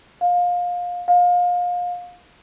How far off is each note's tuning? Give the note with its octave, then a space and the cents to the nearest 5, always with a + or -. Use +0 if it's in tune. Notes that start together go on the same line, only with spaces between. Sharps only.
F5 +25
F5 +30